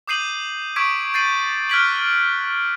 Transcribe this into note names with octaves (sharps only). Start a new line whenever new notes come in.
D6 D#6 G6 C7 D#7 F#7
C#6 D6 E6 G#6 B6 D7
G6 A6 C7 D#7 F#7
F6 F#6 G#6 B6 D7 F#7